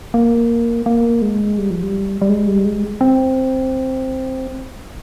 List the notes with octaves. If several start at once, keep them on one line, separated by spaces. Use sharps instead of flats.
A#3
A#3
G#3
G3
F3
G3
G3
G#3
G3
G#3
C4